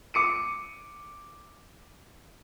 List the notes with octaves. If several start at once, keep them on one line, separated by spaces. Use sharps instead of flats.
D6 C#7 D#7